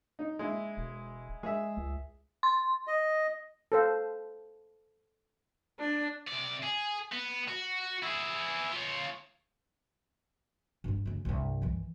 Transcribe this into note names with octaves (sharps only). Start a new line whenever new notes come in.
D#4
G#3 E4
E1
G#3 G#4 E5
C#2
C6
D#5
A4 C5 F5
D4
C2 D5
G#4
B3
F#4
E4 G#4
F4 C#5
G2 G3
D2 C#3
C2 G2
D#3 E3